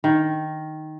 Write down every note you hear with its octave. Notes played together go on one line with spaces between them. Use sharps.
D#3